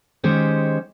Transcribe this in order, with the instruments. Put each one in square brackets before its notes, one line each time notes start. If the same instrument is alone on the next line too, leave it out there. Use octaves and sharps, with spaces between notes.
[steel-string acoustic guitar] D#3 G#3 C#4 G4 C5 C#5